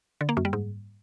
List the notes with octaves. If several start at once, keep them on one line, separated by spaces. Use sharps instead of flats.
D3
A#3
F#2
G3
G#2